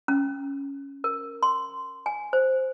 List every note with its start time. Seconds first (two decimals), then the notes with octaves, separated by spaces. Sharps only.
0.08 C#4
1.04 A#4
1.43 C6
2.06 G#5
2.33 C5